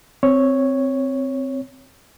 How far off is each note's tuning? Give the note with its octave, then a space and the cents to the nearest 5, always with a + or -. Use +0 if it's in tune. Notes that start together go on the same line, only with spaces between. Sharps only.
C4 +0 C#5 +0